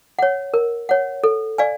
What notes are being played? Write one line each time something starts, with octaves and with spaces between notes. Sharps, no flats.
C#5 F#5
A#4
C#5 F#5
A4
D5 F5 G#5